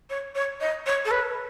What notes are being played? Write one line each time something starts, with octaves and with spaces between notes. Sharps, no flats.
C#5
C#5
D#5
C#5
A4
B4